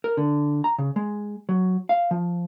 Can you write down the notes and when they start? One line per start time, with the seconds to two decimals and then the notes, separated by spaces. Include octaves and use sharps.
0.04 A#4
0.17 D3
0.64 A#5
0.78 C#3
0.96 G#3
1.49 F#3
1.89 F5
2.11 F3